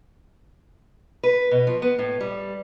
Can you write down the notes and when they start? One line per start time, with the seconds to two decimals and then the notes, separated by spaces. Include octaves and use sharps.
1.24 B4
1.51 B2
1.67 F3
1.82 B3
1.99 A2
2.21 G3